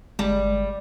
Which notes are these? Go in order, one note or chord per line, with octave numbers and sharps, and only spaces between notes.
G1 G3 G#3